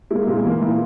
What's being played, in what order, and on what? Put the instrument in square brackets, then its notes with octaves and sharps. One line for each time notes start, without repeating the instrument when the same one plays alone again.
[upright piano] G#3 [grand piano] A#3 E4
[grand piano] A#2 [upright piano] G#3
[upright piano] E3 [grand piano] A#3 E4
[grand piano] A#2 [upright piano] E3